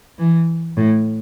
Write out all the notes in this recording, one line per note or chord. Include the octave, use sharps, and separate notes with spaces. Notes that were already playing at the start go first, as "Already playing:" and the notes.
E3
A2